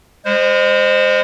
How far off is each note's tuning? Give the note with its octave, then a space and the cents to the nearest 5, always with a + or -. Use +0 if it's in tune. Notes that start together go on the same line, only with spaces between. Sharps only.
G#3 -30 C5 +0